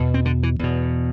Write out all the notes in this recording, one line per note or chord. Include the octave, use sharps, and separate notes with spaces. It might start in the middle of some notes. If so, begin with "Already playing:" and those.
Already playing: E2 B2
C4
D3
E3
E2 B2